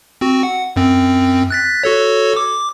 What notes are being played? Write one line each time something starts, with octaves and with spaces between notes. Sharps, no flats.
C4 F#4
F#5
F#2 C4
F#6 A6 B6
F#4 A4 C#5
D6